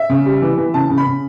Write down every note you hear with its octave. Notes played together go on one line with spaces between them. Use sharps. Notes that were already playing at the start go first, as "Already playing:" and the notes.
Already playing: E5
C#3
G3
E3
E3
C#3 A5
C#3
B5
C#3